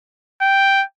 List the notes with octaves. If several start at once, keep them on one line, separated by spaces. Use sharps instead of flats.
G5